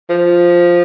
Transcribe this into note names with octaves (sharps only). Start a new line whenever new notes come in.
F3